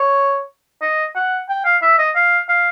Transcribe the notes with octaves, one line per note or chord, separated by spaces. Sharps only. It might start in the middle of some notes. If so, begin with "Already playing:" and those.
Already playing: C#5
D#5
F#5
G5
F5
E5
D#5
F5
F5